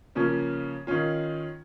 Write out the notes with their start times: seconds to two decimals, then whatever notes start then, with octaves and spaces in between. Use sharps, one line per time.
0.15 C#3 F3 A#3 C#4
0.87 D#3 C#4 F4